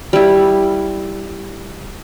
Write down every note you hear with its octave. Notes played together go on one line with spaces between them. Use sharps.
G3 E4